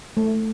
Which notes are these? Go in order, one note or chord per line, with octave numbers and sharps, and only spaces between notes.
A3